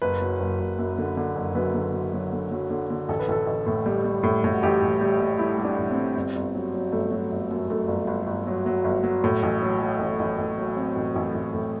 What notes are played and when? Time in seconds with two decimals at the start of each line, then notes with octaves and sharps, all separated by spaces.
0.02 F#1 B4
0.21 F#3
0.40 F#1
0.60 F#1
0.79 F#2
0.98 D3
1.17 D3
1.35 F#1
1.55 F#2 B4
1.74 D3
1.93 F#2
2.13 F#3
2.32 D3
2.51 F#3
2.70 D3
2.90 D3
3.09 A1 A4
3.20 B4
3.28 A1 A4
3.47 A1
3.67 A2
3.86 G3
4.04 G3
4.23 A2
4.44 A2
4.50 F#4
4.63 A1 G4
4.82 A1
5.01 G3
5.19 G3
5.39 G3 E4
5.58 G3
5.64 D4
5.78 A1
5.91 C4
5.97 G3
6.15 G1
6.35 G1
6.55 F#3
6.74 F#3
6.92 G1 A3
7.11 F#3
7.32 G1
7.51 F#2
7.70 F#2 A3
7.88 G1
8.07 G1
8.27 G1
8.47 F#3
8.66 F#3
8.84 G1
9.04 F#3
9.24 A2
9.43 A1
9.62 F#3
9.81 F#3
9.99 A1
10.19 A1
10.38 A1
10.58 F#3
10.76 F#3 C4
10.96 A1
11.16 A1
11.35 A1
11.54 A2